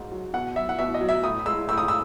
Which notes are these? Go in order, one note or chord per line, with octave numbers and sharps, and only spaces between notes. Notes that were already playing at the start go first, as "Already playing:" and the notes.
Already playing: G#2 F#3
F#3
B2 F#5
F#3 E5
F#5
B2 E5
D#5
F#3
E5
A2 D#6
G#3 E6
A2 E6
D#6
E6